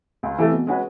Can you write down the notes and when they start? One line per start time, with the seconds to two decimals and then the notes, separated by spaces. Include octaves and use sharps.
0.23 C#2
0.38 C3 E3 A3
0.52 B2
0.67 G#3 C#4 F#4 B4